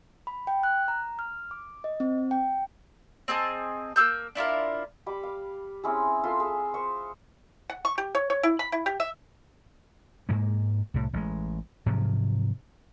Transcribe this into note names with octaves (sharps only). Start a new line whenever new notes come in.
B5
G5
F#6
A#5
F6
D6
D#5
C4
G5
C4 G#4 D#5 A5
A#3 G#4 E6 G6
D4 E4 F4 A#4
G3 B5 D6
F5
C4 C#4 E4 G#4
F4 A4 E5 C6
G#4
C5 C#6
F#5
C#6
G4
C#5
C#5
E4
B5
E4
G4
E5
G#2 G#3 A#3
C2 A2
A1 G#3
G#2 C3 F3 F#3